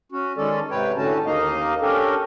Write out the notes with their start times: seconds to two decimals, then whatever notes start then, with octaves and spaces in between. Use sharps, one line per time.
0.12 C#4 F#4
0.37 D#3 G#3 C#4 A4 D5
0.71 G#2 C3 B4 C#5 G5
0.97 A2 D3 A3 C#4 F#4 A5
1.26 D#2 A#3 D#4 D#5 F5
1.81 C#4 D4 G4 A4 A#4